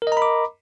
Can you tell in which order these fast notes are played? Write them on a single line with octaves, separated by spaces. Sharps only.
A#4 D#5 A#5 B5 D6